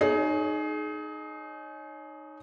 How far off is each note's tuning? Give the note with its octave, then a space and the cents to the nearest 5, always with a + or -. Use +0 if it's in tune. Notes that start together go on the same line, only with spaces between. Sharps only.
D#4 -15 G#4 +25 C#5 +0